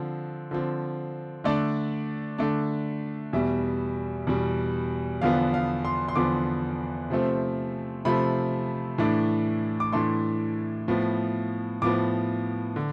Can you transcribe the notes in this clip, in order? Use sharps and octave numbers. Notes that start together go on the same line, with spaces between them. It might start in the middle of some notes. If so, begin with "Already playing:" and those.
Already playing: D3 F3 C4
D3 F3 C4
D3 A3 D4 D5
D3 A3 D4
E2 B2 G3 E5
E2 B2 G3
E2 D3 F3 B3 F5
F5
C6
C6
E2 D3 F3 B3 D6
C3 F3 A3 C4
C3 F3 A3 C4 B5
A2 E3 A3 D4
D6
A2 E3 A3 D4 C6
A2 F3 B3
A2 F3 B3 D6
D3